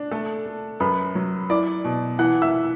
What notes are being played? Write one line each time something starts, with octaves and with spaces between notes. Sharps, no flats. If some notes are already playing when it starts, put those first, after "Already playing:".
Already playing: D4
A3 A4 A5
A3
F#2 B4 B5
F#3
E4 D5 D6
B2
E3 F#5 F#6
E5 E6